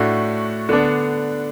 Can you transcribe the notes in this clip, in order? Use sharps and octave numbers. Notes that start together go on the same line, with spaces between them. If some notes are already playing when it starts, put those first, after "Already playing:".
Already playing: A2 A3 D4 F#4
D3 B3 D4